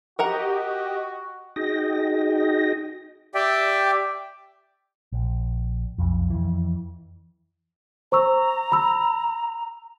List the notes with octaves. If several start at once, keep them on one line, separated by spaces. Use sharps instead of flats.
F#4 G4 A#4 D#5 F#5 A#5
D#4 F#4 G#4 D#5 G5 A#6
G4 D5 E5 G5
A#1
B1 F2
F2 E3
C5 A#5 C#6 E6
B5 E6